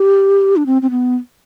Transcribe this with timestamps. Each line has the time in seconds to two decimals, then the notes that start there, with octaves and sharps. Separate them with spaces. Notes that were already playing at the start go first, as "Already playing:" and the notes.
Already playing: G4
0.56 D4
0.66 C4
0.82 C4
0.90 B3